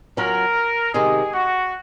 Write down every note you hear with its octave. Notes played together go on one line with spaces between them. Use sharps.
F#3 C#4 F4 A#4
C3 D#3 G#3 G#4
F#4